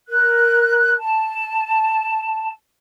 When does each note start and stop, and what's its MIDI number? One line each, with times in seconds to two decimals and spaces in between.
0.09 0.96 70
0.09 0.96 90
1.00 2.50 81